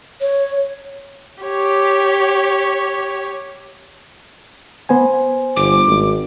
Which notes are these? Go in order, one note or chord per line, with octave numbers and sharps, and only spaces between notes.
C#5
G4 C#5
B3 C5 G#5
G1 D6
G#1